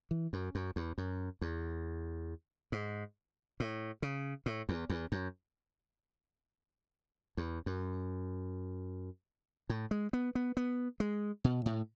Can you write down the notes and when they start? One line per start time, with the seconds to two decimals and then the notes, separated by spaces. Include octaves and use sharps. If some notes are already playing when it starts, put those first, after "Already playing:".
0.11 E3
0.33 F#2
0.55 F#2
0.76 E2
0.98 F#2
1.41 E2
2.72 G#2
3.60 A2
4.02 C#3
4.46 A2
4.69 E2
4.90 E2
5.12 F#2
7.37 E2
7.66 F#2
9.69 A2
9.91 G#3
10.13 B3
10.35 B3
10.57 B3
11.00 G#3
11.44 B2
11.66 A2